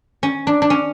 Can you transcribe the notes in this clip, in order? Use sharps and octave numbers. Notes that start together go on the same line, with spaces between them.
C#4
D4
D4
C#4